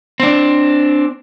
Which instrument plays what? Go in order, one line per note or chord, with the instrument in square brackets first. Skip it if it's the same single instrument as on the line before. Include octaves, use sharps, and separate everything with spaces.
[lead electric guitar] C4 D4